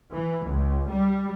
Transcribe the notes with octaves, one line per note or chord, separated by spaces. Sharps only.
E3
C#2
G3